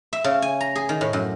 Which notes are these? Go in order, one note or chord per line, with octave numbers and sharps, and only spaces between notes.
E5
C#3
G#5
A#5
G#4
D#3
A2
F#2